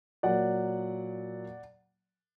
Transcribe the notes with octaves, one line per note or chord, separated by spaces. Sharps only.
A#2 F#3 A#3 D5 F#5